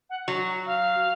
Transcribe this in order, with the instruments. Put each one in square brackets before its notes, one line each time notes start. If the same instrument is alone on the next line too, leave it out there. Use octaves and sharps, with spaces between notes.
[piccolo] F#5
[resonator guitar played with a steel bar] F#3
[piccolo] F5